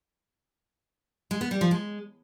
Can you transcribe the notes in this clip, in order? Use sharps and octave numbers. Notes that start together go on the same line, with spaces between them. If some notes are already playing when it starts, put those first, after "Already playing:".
G#3
B3
G3
F3
G#3